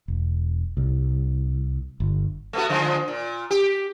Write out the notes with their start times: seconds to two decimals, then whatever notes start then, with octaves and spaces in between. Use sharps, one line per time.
0.08 E1
0.77 C2
2.00 G1
2.53 A3 B3 F#4
2.69 D3 F3 G#3
3.08 A#2
3.51 G4